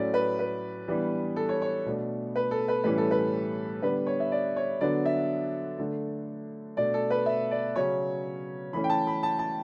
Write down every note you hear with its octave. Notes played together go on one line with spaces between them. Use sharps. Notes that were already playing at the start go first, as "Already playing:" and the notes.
Already playing: A2 F#3 A3 C#4 D5
B4
B4
E3 G3 B3 D4
A4
C#5
C#5
B2 A3 D4
B4
A4
B4
A2 E3 G3 C#4 B4
A4
B4
D3 G3 B3 D4 B4
C#5
E5
D5
C#5
D3 F#3 B3 D4 D5
E5
D3 A3 D4
B2 A3 D4 D5
A4
B4
E5
D5
C#3 F#3 C#4 C#5
E3 A3 C#4 B5
G5
A5
B5
A5
A5